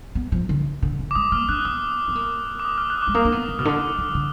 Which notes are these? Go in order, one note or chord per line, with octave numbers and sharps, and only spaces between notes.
B3
F3
D3
D3
D3
D6
G#3 D#6
A#3 F6
D4 F#6
B3 D#6
B3
A#3
D6
D#6
F6
F#6
D#6
D6
G#3
A#3 D#6
D4
B3
D#3
B2 F6
D3 D#6
D#3
D3